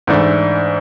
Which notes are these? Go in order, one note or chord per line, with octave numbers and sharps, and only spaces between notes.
G#2 E3 A3 D4